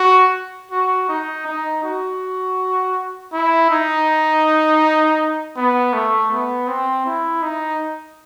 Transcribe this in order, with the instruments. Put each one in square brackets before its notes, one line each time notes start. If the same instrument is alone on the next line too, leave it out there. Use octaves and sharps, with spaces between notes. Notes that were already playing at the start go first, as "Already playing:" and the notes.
Already playing: [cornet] F#4
F#4
D#4
D#4
F#4
E4
D#4
B3
A3
B3
C4
E4
D#4